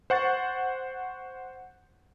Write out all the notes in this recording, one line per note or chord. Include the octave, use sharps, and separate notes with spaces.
C5 F#5 C#6 A6